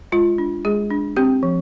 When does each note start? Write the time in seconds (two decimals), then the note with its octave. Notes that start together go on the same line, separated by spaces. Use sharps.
0.12 G#3 F4
0.38 D4
0.65 G#3 G#4
0.90 D4
1.17 C4 G4
1.43 F3